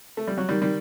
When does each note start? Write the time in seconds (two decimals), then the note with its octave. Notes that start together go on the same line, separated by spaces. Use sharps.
0.17 A3
0.27 G3
0.38 F#3
0.49 D#3 G3
0.62 D#3 G3